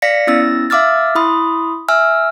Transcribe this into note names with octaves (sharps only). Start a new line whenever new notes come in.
D5 F5 A#6 B6 C#7
B3 C#4 E4 E6 A6 A#6
E5 F5 D6 E6 F6 A6
E4 B5 C6 D#6
E5 G#5 E6 F6